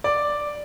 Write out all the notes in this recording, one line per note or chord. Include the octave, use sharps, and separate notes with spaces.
D5